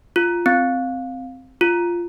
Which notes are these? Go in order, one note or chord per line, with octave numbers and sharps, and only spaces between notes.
F4
C4
F4